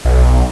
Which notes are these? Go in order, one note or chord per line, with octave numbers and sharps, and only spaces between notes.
B1